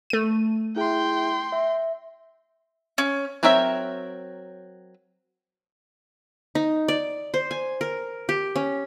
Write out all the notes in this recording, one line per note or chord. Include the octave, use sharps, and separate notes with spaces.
A3 D#7
E4 G#4 E5 G5 C6
E5
C#4
F#3 C4 A#4 C#5 E5
D#4
D5
C5
G#5
A#4
G4
C#4